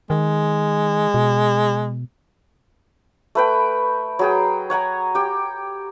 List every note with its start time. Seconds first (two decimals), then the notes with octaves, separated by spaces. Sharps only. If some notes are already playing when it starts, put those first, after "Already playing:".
0.10 D#3 G#3
1.14 B2
3.35 A3 B4 G5
4.19 F#3 G#4 G5
4.70 C#5 F#5 G#5 A#5
5.15 G4 G5